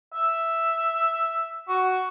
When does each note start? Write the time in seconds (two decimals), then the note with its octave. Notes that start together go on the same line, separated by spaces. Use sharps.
0.14 E5
1.68 F#4